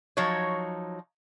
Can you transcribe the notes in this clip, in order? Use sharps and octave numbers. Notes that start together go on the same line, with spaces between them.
F3 F#3 D#4 C#5